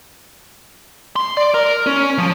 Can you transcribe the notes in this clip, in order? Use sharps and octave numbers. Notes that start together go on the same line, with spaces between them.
C6
D5
A#4
C#4
F3